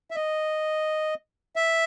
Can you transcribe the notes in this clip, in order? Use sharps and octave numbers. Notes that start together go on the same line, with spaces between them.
E5
D#5
E5